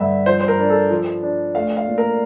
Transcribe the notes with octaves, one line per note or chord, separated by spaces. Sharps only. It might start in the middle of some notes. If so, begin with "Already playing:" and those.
Already playing: G2 D3 E5
F3 C5
C5
A#4
D4
A4
F3
D4
A3 F5
F5
A#2
A#4